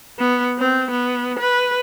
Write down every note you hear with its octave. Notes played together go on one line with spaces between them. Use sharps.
B3
C4
B3
B4